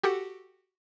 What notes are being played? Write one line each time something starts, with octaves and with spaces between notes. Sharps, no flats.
F#4 G4 A4 F#5